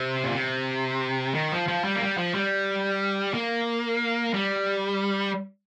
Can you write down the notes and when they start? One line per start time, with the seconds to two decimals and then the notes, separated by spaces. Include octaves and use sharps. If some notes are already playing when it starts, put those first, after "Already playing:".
Already playing: C3
0.24 A#2
0.34 C3
1.34 D#3
1.52 F3
1.68 F3
1.84 G3
1.95 A#3
2.02 G3
2.18 F3
2.34 G3
3.34 A#3
4.34 G3